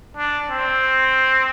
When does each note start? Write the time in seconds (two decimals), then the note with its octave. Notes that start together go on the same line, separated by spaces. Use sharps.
0.17 D4
0.50 C4